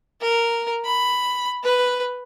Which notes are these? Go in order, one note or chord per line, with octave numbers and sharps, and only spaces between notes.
A#4
B5
B4